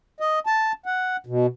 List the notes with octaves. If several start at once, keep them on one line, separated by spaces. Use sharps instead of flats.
D#5
A5
F#5
B2